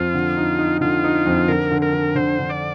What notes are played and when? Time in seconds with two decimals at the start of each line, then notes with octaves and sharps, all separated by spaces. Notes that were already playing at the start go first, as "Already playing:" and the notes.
Already playing: F2 F4
0.14 D3
0.37 D#4
0.59 D#4
0.81 D3 F4
1.04 D#4
1.26 F2
1.48 D3 A#4
1.71 D3
1.82 A#4
1.93 D3
2.15 D3 C5
2.39 D3
2.50 D5